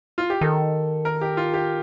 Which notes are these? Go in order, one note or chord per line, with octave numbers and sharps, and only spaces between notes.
F4
G4
D#3 A4
A#4
G4
F4
G4